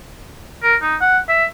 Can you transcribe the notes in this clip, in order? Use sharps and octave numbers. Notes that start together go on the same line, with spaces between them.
A#4
D#4
F#5
E5